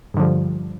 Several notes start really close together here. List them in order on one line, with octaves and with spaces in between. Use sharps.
G2 D3 F3 G3